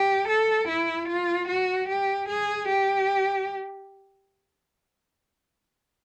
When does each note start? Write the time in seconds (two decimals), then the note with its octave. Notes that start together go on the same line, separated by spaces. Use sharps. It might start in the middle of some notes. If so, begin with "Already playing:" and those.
Already playing: G4
0.28 A4
0.68 E4
1.08 F4
1.48 F#4
1.88 G4
2.28 G#4
2.68 G4